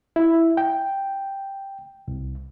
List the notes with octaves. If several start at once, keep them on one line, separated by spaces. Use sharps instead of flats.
E4
G5
C2